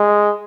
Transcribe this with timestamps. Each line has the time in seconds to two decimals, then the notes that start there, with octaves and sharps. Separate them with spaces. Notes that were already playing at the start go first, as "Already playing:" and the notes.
Already playing: G#3